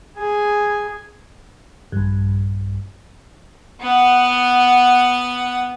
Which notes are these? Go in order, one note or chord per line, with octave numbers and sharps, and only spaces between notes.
G#4 G#5
A#1 G2
B3 F#5